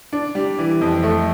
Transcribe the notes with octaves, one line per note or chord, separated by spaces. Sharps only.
D4
G3
E3
F2
A3